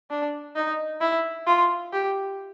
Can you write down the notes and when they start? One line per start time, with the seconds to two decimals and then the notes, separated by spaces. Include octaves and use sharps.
0.10 D4
0.56 D#4
1.01 E4
1.47 F4
1.93 G4